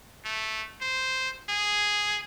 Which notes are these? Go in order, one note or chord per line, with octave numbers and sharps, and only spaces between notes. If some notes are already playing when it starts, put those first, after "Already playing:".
A3
C5
G#4